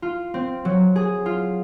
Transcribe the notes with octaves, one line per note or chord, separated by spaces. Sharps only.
F4
C4
F#3
G#4
F4